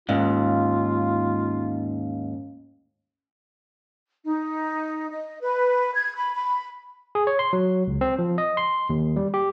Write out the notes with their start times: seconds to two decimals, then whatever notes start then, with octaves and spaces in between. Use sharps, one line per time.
0.09 D#2 G#2 C#4 F4 F5
4.25 D#4
5.11 D#5
5.41 B4
5.95 G#6
6.16 B5
6.35 B5
7.15 G#4
7.27 C#5
7.39 C6
7.53 F#3
7.87 C#2
8.01 C4
8.19 F3
8.38 D#5
8.57 C6
8.90 D#2
9.16 G3
9.34 G4